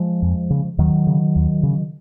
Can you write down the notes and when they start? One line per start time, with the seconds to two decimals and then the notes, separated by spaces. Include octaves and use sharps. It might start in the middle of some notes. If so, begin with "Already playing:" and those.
Already playing: F3 G#3
0.22 F2
0.50 C#3
0.78 D#2 D#3 F#3
1.07 C#3
1.36 D#2
1.63 C#3